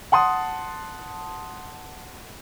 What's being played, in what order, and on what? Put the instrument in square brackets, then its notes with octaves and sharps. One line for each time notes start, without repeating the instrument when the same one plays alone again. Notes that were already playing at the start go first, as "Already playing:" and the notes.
[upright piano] F#5 A5 C6 D#6